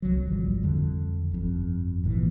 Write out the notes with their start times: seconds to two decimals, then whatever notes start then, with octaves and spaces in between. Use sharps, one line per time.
0.02 C2 F#3
0.28 G#1 D3 F3 G3
0.63 F2 D3
1.32 G1 F2
2.04 G#1 A#2 C#3 E3